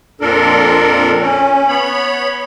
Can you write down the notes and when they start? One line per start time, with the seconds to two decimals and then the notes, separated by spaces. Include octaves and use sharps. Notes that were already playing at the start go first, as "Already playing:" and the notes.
0.21 F2 A#2 D4 A4 A#4
1.21 C#4
1.68 B3 C#5 B5